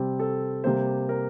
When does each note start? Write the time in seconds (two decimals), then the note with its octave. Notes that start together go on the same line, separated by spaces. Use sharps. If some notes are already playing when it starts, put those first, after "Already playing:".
Already playing: C3 G3 C4
0.20 A4
0.64 C3 G3 A#3 C5
1.09 A#4